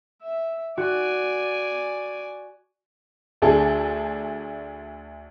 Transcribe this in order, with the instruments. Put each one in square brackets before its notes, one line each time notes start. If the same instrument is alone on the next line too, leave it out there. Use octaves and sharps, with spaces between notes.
[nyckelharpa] E5
[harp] F#4 [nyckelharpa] D5 G#5
[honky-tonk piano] D2 D4 G#4 A4